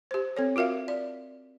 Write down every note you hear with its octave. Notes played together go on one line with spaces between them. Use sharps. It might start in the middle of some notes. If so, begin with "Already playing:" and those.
G4 C5
C4 A4 C#5
F4 F#4 A#4 E5 F5
D5